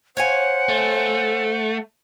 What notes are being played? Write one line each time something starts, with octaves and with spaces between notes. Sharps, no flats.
C5 C#5 F5 F#5 G#5
A3